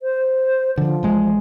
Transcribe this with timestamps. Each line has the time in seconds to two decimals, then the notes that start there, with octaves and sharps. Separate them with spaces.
0.01 C5
0.78 D3 F3
1.03 A1 G#3